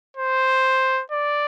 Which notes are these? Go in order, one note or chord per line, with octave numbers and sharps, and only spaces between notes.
C5
D5